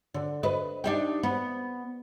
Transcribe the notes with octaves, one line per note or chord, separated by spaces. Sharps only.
D3
B4 D#5
D4 D#4 G4
B3